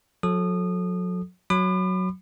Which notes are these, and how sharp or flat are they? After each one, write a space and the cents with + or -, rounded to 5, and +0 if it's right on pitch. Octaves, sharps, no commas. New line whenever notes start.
F#3 -40 A4 -15 D#6 -25
F#3 +0 B5 +20 D6 +45